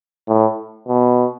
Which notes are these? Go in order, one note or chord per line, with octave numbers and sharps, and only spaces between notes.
A2
B2